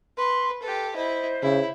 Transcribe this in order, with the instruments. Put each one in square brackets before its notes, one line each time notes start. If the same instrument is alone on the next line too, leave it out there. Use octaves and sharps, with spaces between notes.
[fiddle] B4 [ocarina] C6
[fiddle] G4 A4 [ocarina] B4
[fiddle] E4 D#5 [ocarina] C5
[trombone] C#3 [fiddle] E4